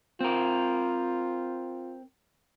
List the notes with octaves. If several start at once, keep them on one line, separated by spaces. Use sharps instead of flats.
C4 F4 A#4